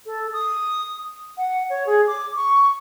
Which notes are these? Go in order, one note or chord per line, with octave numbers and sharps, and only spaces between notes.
A4
D#6
F#5
C#5
G#4
D6
C#6